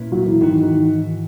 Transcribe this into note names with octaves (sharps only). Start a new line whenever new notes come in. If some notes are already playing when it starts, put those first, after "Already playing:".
Already playing: A#2 A#3 C#4 E4 B4
F#3
E3
G#2 D#3 E3 F#4
D#3